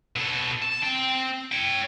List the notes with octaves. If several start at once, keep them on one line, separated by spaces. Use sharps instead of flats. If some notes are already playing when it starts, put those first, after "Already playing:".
B2 A4
A5
C4 G5
C#5 G5